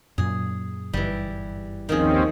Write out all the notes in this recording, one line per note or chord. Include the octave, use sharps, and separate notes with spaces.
F#2 A#2 F#3 G#4
G1 E3 G3
D#2 D#3 F3 C4 C#4 G#4